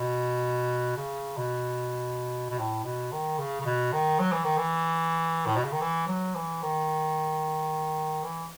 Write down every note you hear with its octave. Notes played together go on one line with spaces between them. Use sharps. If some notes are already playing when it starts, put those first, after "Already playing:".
Already playing: B2
C#3
B2
B2
A2
B2
D#3
C#3
C#3
B2
D#3
F#3
E3
D#3
E3
A2
B2
C#3
D#3
E3
F#3
E3
D#3
E3